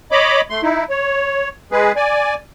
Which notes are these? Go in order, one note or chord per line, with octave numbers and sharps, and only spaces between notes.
C#5 D#5 B5 D6
A3 C6
D#4 E4
C#5
G#3 G#4 B4
D5 G#5